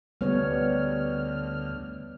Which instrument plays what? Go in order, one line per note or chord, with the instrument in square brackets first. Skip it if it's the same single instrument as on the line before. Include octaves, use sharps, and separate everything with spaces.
[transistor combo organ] D2 F6 [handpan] G3 B3 C#5